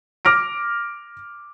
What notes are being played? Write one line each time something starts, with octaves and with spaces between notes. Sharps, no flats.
D6 F6 A#6 D7